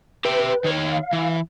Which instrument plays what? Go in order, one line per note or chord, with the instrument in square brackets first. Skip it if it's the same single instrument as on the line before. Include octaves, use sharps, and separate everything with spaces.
[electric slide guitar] G4 E5 G5 [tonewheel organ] B4
[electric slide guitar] D#3 C#5
[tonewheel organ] F5
[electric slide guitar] E3